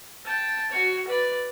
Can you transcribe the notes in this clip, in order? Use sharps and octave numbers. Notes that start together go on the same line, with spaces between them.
G5 A5
F#4 C#5
B4 D5